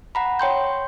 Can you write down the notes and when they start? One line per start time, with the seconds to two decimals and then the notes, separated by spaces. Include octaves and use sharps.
0.15 F#5 A#5 B5
0.39 C#5 G5 C6 G6